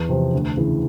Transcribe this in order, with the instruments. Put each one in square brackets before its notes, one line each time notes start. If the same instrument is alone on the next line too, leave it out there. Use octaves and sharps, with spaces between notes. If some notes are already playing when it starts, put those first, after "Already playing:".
Already playing: [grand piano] E2
C3 F3
D2
C#3 E3